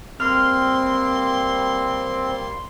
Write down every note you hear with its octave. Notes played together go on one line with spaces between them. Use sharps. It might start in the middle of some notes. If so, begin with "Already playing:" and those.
G3 A#3 C4 C6 F6